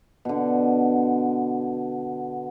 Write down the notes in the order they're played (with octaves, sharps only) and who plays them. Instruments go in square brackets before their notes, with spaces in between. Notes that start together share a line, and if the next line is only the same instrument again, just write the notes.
[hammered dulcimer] B2 D3